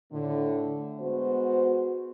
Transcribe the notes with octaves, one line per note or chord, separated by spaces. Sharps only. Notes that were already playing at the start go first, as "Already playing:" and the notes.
A2 D3
G#3 B3 F#4 C5